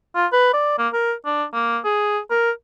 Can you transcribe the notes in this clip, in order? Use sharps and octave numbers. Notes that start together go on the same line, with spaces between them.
F4
B4
D5
A#3
A#4
D4
A#3
G#4
A#4